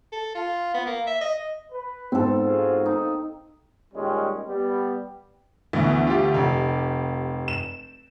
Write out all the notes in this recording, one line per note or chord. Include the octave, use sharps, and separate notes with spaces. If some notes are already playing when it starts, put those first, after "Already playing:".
A4
F4
B3
A#3
E5
D#5
B4
G#2 B3 C4 A4
F4 F#4 G#4
A#3 D#4
A#2 D#3 G3 G#3 C#4
G3 B3
D2 E3 B3
F4 G4
F1
E7